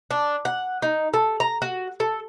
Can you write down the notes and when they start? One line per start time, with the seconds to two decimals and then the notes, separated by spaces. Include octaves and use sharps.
0.11 D4
0.45 F#5
0.82 D#4
1.14 A4
1.40 A#5
1.62 F#4
2.00 A4